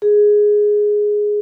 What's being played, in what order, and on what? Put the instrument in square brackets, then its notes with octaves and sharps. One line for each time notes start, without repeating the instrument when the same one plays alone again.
[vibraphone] G#4